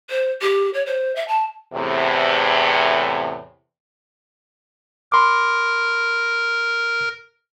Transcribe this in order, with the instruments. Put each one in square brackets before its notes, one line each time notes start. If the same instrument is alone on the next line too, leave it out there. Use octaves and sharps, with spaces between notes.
[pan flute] C5
G4
C#5
C5
E5
A5
[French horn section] E2 A2 C3
[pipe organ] A#4 [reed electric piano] B5 C6 D6